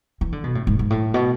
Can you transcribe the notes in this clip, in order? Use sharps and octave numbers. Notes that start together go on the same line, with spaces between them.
E3
D3
B2
A2
G#2
G#2
A2
B2